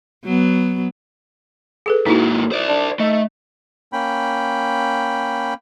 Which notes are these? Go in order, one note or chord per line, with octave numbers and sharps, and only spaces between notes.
F#3 B3
G#4 A4 B4
G#2 A#3 D#4 E4 F#4
C5 D5
D4
A3 D#4
A#3 C#4 G5 B5